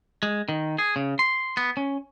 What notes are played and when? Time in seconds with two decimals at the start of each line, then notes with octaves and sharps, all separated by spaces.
0.23 G#3
0.49 D#3
0.78 G#4
0.96 C#3
1.19 C6
1.57 B3
1.77 C#4